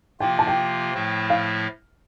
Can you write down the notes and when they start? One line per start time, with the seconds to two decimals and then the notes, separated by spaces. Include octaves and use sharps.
0.20 C3 F3 A#3 F4 G5
0.39 A5
0.47 G5
0.94 A2 F3 A3 E4
1.30 F5